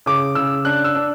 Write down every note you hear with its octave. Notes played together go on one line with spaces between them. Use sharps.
C#3 D6
C#3 E6
D4 F#6
E6
D4